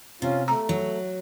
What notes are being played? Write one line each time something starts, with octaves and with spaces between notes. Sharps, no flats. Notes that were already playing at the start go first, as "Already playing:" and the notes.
C3 C#4 F4
A3 A#5
F#3